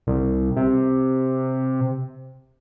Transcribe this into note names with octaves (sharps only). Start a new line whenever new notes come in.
C2
C3